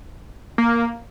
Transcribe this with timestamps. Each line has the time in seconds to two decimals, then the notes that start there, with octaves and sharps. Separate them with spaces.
0.58 A#3